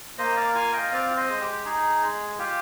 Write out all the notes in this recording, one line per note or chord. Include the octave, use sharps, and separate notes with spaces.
A#3 C5 D#5
D5 F5
F4 F5 G#5
D#5 G5
C4 D5 F5
C5 D#5
G#3
G4
D#4 G#4
G#3
F4 G4